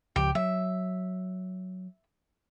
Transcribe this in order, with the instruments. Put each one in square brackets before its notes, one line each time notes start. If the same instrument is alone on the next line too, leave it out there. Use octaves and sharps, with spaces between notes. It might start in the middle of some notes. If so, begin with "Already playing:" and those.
[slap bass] C#2 F3 [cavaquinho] G4
[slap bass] F#3 [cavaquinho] E5